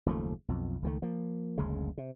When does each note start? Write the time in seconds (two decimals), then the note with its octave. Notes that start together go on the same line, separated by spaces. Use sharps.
0.06 F#1 D#2 F3 A3
0.48 B1 F2
0.82 C#2 D#3 A3
1.02 F3 A#3
1.58 F#1 D2 C#3 G#3
1.98 C3